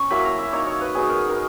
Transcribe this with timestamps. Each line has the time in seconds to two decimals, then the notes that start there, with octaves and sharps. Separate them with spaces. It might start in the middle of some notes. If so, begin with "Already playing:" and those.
Already playing: C#4 C#6
0.10 F#3 A#3 E4 B5
0.25 A#5
0.39 E5
0.52 A#3 D#4 C#5
0.67 C#5
0.81 B4
0.95 F#3 B3 D#4 G#4
1.09 A#4
1.29 A#4